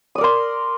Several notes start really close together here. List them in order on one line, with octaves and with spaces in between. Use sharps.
D#6 D5 A#4 C6